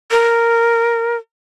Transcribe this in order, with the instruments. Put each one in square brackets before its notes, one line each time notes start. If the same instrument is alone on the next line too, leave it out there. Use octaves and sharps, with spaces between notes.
[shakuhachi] A#4